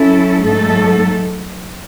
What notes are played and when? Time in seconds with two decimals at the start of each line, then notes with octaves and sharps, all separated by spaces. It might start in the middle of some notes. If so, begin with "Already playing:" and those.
Already playing: F#3 C#4 E4 A4
0.42 G#2 F#3 A3 D#4 A4